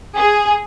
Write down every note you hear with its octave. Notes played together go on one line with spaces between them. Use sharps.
G#4